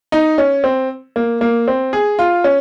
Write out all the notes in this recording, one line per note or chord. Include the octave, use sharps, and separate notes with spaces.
D#4
C#4
C4
A#3
A#3
C4
G#4
F4
C#4